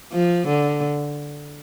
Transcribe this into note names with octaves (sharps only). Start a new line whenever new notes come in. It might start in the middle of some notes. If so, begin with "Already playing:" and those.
F3
D3